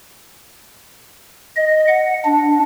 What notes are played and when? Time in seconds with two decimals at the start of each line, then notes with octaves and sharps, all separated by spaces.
1.56 D#5
1.88 F#5
2.25 D4